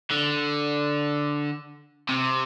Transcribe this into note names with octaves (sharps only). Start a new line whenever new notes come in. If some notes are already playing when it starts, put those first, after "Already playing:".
D3
C3